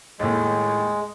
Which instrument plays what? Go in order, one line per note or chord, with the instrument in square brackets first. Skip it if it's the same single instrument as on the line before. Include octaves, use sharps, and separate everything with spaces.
[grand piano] D#2 A2 [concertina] G#3